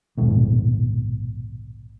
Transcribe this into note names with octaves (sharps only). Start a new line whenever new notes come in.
A#1 D#2 G#2 B2